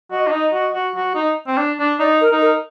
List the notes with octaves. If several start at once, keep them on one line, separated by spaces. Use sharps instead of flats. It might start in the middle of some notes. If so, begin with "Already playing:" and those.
F#4 D#5
D4
D#4
F#4
F#4
F#4
D#4
C4
D4
D4
D#4 D5
A#4
D#4
A#4